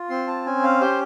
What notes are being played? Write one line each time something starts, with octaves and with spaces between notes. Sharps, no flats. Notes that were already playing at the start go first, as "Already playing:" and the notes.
Already playing: F4
C4 C6
A5
C#4 G#5
F5
G4 C5